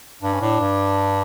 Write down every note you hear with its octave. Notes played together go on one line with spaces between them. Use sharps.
G2 D4
C#4
A2 D4
G2